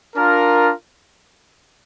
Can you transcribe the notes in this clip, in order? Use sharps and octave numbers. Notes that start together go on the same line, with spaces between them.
D4 F4 A#4